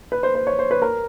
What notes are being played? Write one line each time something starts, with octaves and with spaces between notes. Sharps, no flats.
B4
C5
C5
C#5
C5
B4
A#4